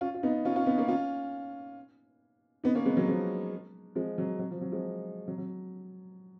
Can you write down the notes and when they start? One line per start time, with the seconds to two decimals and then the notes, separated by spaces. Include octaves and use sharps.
0.01 C#4 F4
0.14 F4
0.23 B3 D#4
0.45 C#4 F4
0.56 C#4 F4
0.66 B3 D#4
0.78 A#3 C#4
0.88 C#4 F4
2.64 B3 D#4
2.75 A#3 C#4
2.86 G#3 B3
2.97 F#3 A#3
3.08 F3 G#3
3.95 F3 G#3
4.18 F#3
4.39 F#3
4.51 F3
4.61 F#3
4.72 F3 G#3
5.28 F#3
5.38 F#3